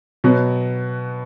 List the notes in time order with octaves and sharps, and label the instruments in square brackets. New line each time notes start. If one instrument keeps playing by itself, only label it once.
[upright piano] B2 F#3 B3